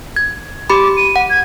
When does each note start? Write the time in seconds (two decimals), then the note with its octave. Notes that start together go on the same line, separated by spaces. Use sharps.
0.16 G#6
0.70 G4 B5 D6
0.97 D#7
1.16 F#5
1.30 G#6